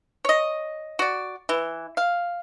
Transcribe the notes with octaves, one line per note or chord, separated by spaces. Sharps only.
C#5 D#5
F#4 D5
E3
F5